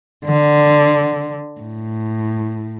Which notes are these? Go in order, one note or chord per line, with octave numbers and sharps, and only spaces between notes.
D3
A2